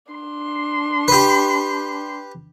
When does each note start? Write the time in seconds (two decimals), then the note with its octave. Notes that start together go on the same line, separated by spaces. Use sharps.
0.12 D4 C6
1.08 G4 B4